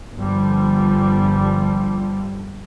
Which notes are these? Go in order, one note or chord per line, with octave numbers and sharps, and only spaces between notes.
G1 D3 F3 G3